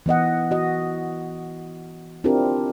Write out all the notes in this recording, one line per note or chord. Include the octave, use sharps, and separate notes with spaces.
E3 B3 D#5 F#5
F#4 D#5
C4 D4 E4 F4 G4 A#4